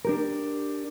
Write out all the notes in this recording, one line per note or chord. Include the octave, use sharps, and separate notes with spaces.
D4 G4 A#4